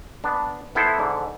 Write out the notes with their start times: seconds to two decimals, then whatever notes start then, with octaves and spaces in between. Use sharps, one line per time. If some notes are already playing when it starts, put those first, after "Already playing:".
0.24 B3 D4
0.75 B3 E4 A4 C5
0.98 G#2 D3